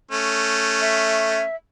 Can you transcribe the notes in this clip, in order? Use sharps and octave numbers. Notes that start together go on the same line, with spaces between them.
A3 C#4
E5